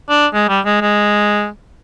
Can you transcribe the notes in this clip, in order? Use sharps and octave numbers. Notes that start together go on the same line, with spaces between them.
D4
G#3
G3
G#3
G#3